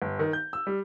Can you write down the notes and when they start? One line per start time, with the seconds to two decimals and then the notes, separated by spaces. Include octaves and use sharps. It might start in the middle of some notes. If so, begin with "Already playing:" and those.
0.02 G1
0.19 D#3
0.33 G6
0.53 E6
0.67 G3